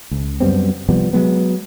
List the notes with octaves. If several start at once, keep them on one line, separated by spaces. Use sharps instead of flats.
C#2
F#2 G3 B3 C4
C3 F3 G3 B3
F#3 G#3 B3